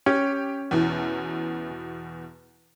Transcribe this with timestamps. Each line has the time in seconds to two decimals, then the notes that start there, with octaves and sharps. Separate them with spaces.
0.06 C#4 G4
0.71 E2 B2 E3